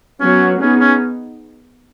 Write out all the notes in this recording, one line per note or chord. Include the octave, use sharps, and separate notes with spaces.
F#3 B3 C#4 F#4
B3 C#4 D#4 G#4
C#4